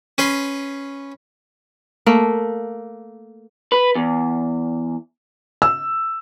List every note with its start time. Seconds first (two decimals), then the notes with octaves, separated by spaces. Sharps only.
0.18 C#4 B4 C6
2.06 A3 A#3
3.72 B4
3.95 E2
5.62 E6